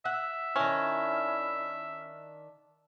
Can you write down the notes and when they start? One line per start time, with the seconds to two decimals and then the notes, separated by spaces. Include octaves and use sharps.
0.05 E5 F#5
0.56 D#3 C#4 D4 E4